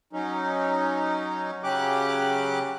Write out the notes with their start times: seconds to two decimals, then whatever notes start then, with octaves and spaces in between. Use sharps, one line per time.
0.13 F#3 C#4 D#4
1.64 C#3 F#3 C#4 G4 D6 F#6